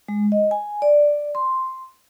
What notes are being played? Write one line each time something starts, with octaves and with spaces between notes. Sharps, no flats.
G#3
D#5
G#5
D5
C6